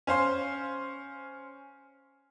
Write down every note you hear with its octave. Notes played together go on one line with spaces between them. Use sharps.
C#4 C5 F5 C6